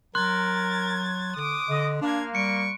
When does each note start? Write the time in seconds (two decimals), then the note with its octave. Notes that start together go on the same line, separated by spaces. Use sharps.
0.15 F#3 A#4 C6 F#6 G#6 A6
1.36 D3 D6 D#6
1.69 D3 D#5
2.01 A#3 D4 F5 G#6
2.35 G3 C#6 C#7 D7